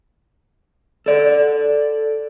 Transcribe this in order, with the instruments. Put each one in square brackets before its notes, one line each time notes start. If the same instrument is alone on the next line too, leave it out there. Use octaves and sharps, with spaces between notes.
[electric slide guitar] A4 D5